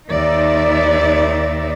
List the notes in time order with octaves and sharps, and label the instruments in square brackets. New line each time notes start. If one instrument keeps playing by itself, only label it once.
[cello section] D#2 D#4 D5 E5